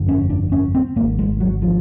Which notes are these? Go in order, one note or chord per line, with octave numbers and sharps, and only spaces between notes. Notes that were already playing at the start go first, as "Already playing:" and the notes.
Already playing: G1 F2 D3
C#4
D4
C#4
C4
G#1 G#2 A#3
G#3
F#3
F3